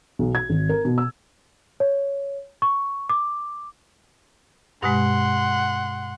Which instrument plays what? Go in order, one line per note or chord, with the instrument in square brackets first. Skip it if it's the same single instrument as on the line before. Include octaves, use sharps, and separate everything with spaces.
[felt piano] B1
G#6
G#1
A#4
B2
E6
[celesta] C#5
C#6
D6
[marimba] G2 B2 G#3 [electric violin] F#5 C6